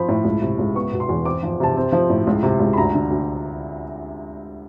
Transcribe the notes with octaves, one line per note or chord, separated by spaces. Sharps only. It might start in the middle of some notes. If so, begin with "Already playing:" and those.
Already playing: F3 C4 B5
A2
C#2
C3
C#2
B3 C#6
B2
C6
E2
C4 D6
F3
C3 A5
C4
F3
A2
C#2
C3
C#2
B5
D2 A#5
D3
D2